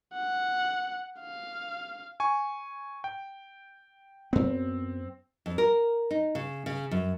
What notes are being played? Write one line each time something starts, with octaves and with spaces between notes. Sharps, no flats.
F#5
F5
G#5 C#6
G5
F#2 B3 C4
F2
A#4
D#4
C#3
C#3
F#2